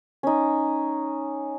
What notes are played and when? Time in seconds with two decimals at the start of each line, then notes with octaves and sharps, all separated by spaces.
0.23 C#4 D#4